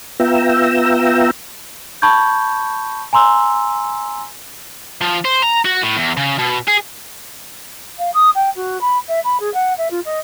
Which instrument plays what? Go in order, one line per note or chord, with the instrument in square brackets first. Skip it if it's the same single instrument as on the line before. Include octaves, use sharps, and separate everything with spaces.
[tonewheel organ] B3 F4 E5 G5 A#5 E6
[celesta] A5 B5 C#6 G6 G#6
G#5 A#5 C6 E6
[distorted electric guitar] F3
C5
A#5
F#4
A2
E2
C#3
B2
G#4
[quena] F5
D#6
G5
F#4
B5
E5
B5
G#4
F#5
E5
F4
D#5